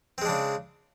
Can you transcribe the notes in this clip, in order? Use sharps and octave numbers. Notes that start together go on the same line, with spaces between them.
C#3 G#3 C4 D4